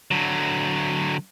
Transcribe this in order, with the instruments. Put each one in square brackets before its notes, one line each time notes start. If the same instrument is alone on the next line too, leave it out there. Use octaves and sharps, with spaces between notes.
[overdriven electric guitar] D3 F#3